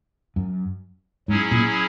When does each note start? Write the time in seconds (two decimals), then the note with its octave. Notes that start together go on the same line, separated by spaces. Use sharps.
0.36 F#2
1.28 G#2 F#3 C#4 E4 G#4
1.51 A#2